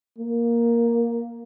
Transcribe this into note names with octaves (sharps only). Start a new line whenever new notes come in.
A#3